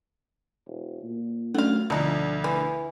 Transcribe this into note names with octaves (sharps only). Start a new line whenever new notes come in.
E1
A#2
F#2 A3 C#4 D4 F5 F#5
D2 B2 D3 F3 D4 D#4
E3